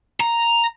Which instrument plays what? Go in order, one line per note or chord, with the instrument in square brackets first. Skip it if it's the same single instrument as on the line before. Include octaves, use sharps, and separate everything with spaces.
[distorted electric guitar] A#5